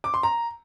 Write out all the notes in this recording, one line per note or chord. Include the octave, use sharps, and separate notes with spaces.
D6
C6
A#5